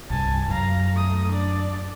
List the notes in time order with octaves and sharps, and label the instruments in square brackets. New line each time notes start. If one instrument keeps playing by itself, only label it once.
[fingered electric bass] C2 G2 [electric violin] G#5 A5
[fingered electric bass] F#2 [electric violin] F5 A#5
[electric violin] A3 D#6
D4 D5